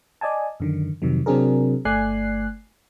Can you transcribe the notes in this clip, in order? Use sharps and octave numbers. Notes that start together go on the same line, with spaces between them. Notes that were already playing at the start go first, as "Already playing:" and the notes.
D5 D#5 G#5 A5
F#2 D3 D#3
F2 C3 D#3 F#3
C3 F#3 C4 D4 G#4 A#4
G1 A3 D5 G#5 F#6 C7